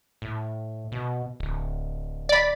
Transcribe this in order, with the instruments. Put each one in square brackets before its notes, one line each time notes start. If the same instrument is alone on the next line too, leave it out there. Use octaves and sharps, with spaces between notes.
[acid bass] A2
B2
D1
[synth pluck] D5 B5